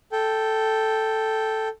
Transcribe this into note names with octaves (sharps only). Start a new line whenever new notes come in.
A4 G5